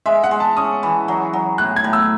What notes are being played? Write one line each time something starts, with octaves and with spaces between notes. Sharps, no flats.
G#3 E5
F#5
G#3
A5
C#4 D#6
E3
F#3
F#3
A2 F#6
G#6
A2
E6